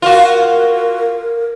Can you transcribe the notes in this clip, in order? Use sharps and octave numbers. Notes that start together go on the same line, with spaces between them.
F4 F#4 A#4